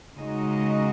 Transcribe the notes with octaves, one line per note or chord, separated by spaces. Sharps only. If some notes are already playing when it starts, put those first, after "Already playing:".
C#3 G#3 D#4 F#4 D#5